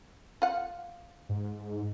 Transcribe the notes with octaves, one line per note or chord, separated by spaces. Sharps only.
F4 F#5
G#2